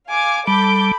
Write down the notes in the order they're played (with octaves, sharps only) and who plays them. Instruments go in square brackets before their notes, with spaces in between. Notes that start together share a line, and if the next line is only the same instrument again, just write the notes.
[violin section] F5 D6 [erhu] G#5
[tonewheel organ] G3 [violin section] A4 D6 G6 [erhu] B5